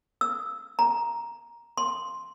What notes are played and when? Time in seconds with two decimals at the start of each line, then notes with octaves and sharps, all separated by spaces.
0.21 E6
0.79 A#5
1.78 C6